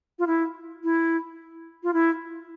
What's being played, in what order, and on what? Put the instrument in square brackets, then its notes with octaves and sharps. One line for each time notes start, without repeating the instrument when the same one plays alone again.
[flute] F4
E4
E4
F4
E4